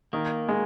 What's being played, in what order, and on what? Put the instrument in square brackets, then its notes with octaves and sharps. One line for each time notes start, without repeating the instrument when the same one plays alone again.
[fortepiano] D#3 [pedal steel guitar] A#3
[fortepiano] G#3